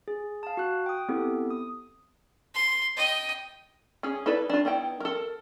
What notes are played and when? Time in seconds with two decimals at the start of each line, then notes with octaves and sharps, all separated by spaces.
0.08 G#4
0.43 F5 A5
0.57 F#4 F#6
0.86 G5 D#6
1.09 B3 C4 E4 G4 A4
1.50 D#6
2.55 C6
2.97 D#5 G5
4.03 C#4 G#4
4.26 D#4 E4 A4 B4 D5
4.50 D4 F4
4.65 B3 D#4 E4 G5
5.00 A4 A#4